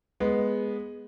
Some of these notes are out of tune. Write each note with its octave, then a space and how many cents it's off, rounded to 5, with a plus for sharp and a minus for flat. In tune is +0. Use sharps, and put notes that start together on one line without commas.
G#3 +0 B3 -5